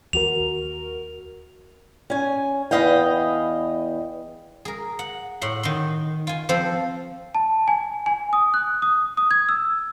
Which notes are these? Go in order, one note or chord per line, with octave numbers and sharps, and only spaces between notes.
D#2 F#4 A#4 F7
C#4 G#5
E2 E3 B4 D#5 F5 G5
G#4 A#4
F#5
A2 F#5 C6
D#3 C6
F4 G#5
F3 C4 A4 C5
A5
G#5
G#5
D#6
F#6
D#6
D#6
G#6
E6